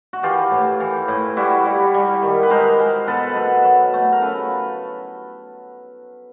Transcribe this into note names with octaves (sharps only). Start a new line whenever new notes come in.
F#4
E3 F4 G4
A2
E3
A2
G3 E4 F#4
G3
G3
D#3
B4
G#3 A#4 C5
G#3
B2 A4 B4
B2 A4 B4
F#3
A3
A#4
C#3 A4 B4